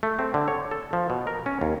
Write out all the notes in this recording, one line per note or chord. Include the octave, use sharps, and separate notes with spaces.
A3
C4
D3
C#5
A4
F3
B2
A#4
C#4
D#2